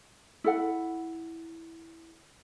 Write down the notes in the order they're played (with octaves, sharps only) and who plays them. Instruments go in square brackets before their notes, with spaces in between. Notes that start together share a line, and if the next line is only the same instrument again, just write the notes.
[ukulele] E4 A4 F#5